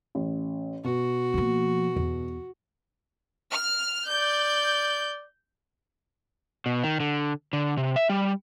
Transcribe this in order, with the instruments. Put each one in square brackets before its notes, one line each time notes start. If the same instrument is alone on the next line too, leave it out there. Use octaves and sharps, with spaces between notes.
[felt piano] A1
[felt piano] B2 [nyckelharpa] F#4
[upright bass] F3 A#3
E2
[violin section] F6
[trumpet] D5 [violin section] G6
[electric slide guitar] B2
D#3
D3
D3
C3
E5
G3